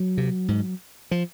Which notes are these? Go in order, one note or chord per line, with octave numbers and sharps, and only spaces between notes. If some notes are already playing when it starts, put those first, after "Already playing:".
Already playing: F#3
C3
G#2
F3